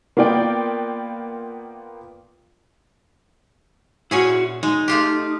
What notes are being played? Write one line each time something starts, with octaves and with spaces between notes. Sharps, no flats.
A#3 B3 F4 D5 G5
A#2 C#4 E4 F#4 G#4
G#3 D#4
A3 F4 G4